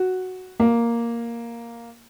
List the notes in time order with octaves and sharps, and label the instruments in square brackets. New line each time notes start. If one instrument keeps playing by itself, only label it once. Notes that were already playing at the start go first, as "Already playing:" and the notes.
Already playing: [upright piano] F#4
A#3